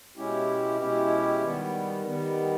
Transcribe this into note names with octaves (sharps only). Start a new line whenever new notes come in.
B2 G#3 C#4 E4 G4
B2 G#3 C#4 E4 G4
D#3 G3 B3
D#3 G3 B3